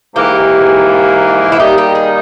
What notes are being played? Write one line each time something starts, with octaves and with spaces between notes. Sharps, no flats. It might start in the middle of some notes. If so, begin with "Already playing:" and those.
G#2 E3 A#3 G4
E4
D#3 G3 A#3 D#4 G4
G4
G#4